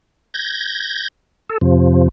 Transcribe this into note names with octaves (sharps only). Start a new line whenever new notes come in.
G6 G#6 A#6
A4
F2 C3 F3